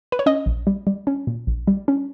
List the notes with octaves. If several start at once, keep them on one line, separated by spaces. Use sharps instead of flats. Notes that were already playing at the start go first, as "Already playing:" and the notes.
B4
C#5
C#4 D#5
A#1
G3
G3
C#4
A#2
A#1
G3
C#4